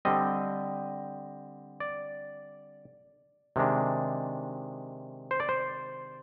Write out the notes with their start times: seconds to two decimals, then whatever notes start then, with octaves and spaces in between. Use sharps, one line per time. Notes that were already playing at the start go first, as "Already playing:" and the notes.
0.05 D3 G3 C4 D#5
1.80 D5
3.56 C3 D#3 G#3 D4
5.31 C5
5.40 D5
5.49 C5